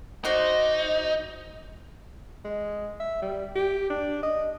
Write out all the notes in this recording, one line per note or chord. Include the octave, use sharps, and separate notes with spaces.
D#4 F#4 C5 D5
G#3
E5
G3
G4
D4
D#5